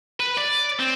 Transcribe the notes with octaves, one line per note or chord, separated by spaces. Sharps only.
B4
D5
C4